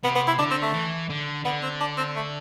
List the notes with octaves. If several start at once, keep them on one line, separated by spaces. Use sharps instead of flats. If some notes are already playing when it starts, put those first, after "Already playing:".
C3 B3
B3
E4
D3 D4
C4
A3
E3
D3
D3 B3
C4
D4
C4
A3